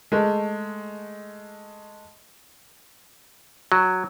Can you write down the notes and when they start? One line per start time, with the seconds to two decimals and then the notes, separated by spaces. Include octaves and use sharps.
0.12 G#3 A3
3.72 F#3